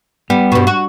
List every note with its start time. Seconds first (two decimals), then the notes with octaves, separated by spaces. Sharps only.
0.30 G3 B3
0.52 G2 B2
0.67 F#4